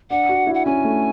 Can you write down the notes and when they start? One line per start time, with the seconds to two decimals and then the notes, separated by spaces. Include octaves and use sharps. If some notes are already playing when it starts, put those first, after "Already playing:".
0.10 D4 F#5
0.29 F#4
0.47 E4
0.54 F#5
0.66 C#4 G#5
0.84 A3